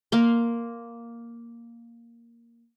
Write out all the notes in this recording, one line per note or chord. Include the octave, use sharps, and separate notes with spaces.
A#3 F5 C6